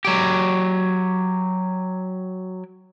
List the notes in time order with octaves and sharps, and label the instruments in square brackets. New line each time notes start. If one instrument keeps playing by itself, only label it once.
[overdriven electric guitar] F#3 G4